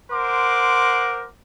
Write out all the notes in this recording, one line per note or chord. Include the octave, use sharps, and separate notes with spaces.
A#4 C5 F#5 C6 D6